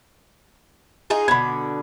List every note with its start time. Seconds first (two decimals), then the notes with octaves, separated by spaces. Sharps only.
1.10 D#4 F4 G#4
1.28 B2 D3 B5 G#6